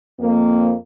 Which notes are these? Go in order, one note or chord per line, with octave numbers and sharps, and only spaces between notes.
F2 A#3